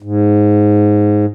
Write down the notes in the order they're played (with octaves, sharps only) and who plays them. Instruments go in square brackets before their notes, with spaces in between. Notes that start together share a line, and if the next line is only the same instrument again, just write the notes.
[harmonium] G#2